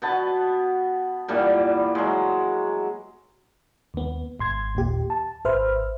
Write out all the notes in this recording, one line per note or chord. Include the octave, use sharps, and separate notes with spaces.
B2 B3 A5
A#2 E3 G3 B3
F#3 G#3
D#2 B3
G#1 C6 G#6
D#2 A#2 G4
A5
G#1 B4 C5 E5 F6